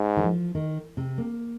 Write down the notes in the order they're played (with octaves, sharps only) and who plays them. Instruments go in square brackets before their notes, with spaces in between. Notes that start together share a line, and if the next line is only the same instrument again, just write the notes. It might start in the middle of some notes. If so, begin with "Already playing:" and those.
Already playing: [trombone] G#2
[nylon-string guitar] D#3
F3
D#3
C3
A#3